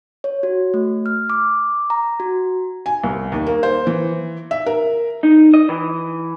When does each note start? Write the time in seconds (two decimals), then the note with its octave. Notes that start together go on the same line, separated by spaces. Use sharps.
0.24 C#5
0.43 F#4
0.74 A3
1.06 F6
1.30 D6
1.90 A#5
2.20 F#4
2.86 G#5
3.04 C2
3.32 D#2
3.47 A#3
3.63 C5
3.87 E3
4.51 E5
4.66 A#4
5.23 D#4
5.54 D#5
5.69 E3